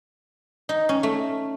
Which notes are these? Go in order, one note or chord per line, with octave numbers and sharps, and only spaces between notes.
D#4
C#4
A3